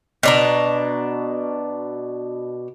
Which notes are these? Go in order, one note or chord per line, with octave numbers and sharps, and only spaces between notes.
B2 D4 A#5